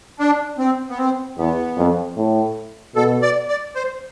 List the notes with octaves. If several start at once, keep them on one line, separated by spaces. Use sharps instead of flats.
D4
C4
B3
C4
E2 B3
F2
A2
B2 A4
D5
D5
C5